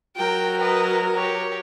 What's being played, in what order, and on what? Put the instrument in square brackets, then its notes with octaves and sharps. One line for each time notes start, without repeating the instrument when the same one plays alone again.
[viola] F#3 A#4 [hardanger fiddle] G5
[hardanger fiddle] B4 D#5
G4 C#5